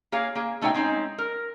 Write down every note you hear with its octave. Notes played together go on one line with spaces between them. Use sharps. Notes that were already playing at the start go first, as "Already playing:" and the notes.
A#3 G#4 C#5 F5
A#3 G#4
B2 A3 D#4 C#5 F#5 G5
G#3 C4 C#4 D#4
A#4